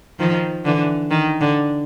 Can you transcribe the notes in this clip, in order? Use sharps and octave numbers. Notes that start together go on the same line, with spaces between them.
D#3 F3
D3 E3
D#3
D3